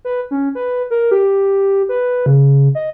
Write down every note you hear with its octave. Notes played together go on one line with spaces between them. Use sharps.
B4
C#4
B4
A#4
G4
B4
C#3
D#5